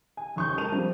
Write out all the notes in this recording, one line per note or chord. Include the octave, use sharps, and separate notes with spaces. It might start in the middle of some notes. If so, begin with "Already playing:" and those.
G#5
F#1 D#2 C#6 D#6 G6
G#3 A#4 A5 D#7 F7
F3 G3 C4 D4